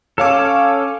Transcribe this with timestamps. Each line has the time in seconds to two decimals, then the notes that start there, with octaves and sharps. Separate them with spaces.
0.18 C#4 A4 C#5 F5 D6